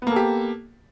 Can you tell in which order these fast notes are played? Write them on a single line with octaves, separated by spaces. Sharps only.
B3 A#3 A4 G4